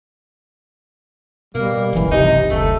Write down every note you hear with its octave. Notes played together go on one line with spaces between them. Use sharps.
B2 G3 A#3
D1 G1 C#2 E3
C3 D#4
F#1 D2 A3 A4